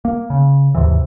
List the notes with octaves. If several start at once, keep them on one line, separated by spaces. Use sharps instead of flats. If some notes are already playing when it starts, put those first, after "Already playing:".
A#3
C#3
D#2 G#2 C3 E3